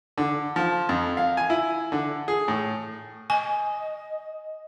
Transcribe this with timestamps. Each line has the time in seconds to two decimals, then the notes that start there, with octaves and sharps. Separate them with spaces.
0.18 D3
0.56 F3
0.89 F2
1.17 F5
1.37 G#5
1.50 E4
1.92 D3
2.28 G#4
2.48 A2
3.30 D#5 G#5